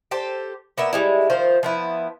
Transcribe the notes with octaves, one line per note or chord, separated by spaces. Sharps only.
G4 A4 C5
A#3 B3 E5
G3 G#3 E4
D#3 F3 C5
F3 B3 E4